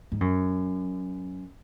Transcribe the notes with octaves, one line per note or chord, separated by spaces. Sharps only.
G#2
F#2